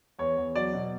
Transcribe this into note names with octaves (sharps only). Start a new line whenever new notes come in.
E2 C#5
E2
F#3 D5
B2